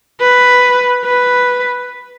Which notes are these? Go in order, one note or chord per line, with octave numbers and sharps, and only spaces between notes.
B4
B4